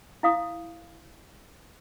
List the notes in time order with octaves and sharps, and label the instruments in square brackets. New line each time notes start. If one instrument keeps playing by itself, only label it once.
[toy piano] E4 F5 D#6